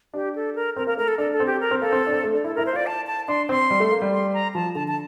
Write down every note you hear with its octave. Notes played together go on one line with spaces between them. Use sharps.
D4 G4
A4
A#4
C4 A#4
A#3 A#4
A3 A#4
A4
D4 A4
A4
C4
G4
A#4
C4
A#3 A4
C4
D4
C4
A3
D4
E4 A4
A#4
E4
C5
F4 D5
A5
A5
D4 C6
C4 C6
G3
A3
A#3
G3
C6
A#5
F3 A5
D3 A5
A5